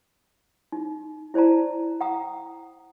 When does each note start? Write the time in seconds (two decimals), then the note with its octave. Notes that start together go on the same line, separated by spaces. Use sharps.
0.72 D#4
1.34 E4 C5 D5 A5 A#5
2.01 F#5 G5 A#5 D#6